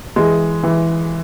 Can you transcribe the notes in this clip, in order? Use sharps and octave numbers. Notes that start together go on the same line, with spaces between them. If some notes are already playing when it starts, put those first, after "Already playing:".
E3 G#3
E3